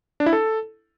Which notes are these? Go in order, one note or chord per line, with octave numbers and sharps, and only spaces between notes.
D4
E4
A4